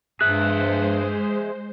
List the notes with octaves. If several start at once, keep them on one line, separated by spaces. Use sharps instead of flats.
G2 G#3 G#4 C5 E5 F#6